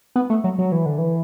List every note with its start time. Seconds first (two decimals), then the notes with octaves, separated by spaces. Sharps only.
0.16 B3
0.30 A3
0.44 F#3
0.59 F#3
0.72 E3
0.86 D3
0.98 E3